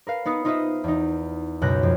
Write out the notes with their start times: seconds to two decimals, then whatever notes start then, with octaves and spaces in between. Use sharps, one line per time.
0.07 A#4 B4 F5
0.26 B3 D#4 B4 D#6 C#7
0.45 D#4 F4 B4 C5 D#5 E5
0.84 E2 D#4
1.61 C#2 F#2 B2 F#6 G6 A#6
1.83 F2